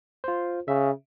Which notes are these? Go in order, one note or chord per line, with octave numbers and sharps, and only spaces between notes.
F4 C5
C#3 E5